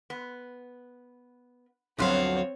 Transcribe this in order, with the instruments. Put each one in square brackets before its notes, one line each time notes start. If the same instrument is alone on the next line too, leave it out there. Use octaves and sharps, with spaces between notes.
[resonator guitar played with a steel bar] B3
[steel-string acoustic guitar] D2 F#3 F5 [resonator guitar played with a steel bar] G2 F3 B3 [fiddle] C4 C#5